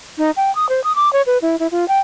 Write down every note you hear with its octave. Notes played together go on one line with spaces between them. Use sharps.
D#4
G5
D#6
C5
D#6
D6
C#5
B4
E4
E4
F4
G5